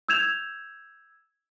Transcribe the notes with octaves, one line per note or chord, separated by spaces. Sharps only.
E6 G6 G#6 E7 F7